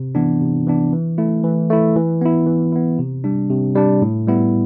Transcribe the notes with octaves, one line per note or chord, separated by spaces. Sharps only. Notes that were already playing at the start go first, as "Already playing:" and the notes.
Already playing: C3
E3 B3 D4
C3
E3 B3 D4
E3
A3 E4
E3
A3 E4
E3
B3 E4
E3
B3 E4
C3
G3 D4
C3
G3 D4
A2
G3 B3 E4